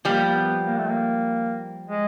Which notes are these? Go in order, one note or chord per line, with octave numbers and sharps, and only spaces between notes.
F3 G3 A#3
A#3
B3
A#3
A3
A#3
G#3